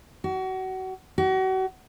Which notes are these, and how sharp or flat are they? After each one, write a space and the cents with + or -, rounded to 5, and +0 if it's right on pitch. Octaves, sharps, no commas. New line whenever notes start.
F#4 +30
F#4 +35